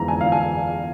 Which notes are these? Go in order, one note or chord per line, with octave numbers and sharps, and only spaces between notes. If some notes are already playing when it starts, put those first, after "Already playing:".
Already playing: G1 F2 E3 G#3 A#5
G#5
F5
G#5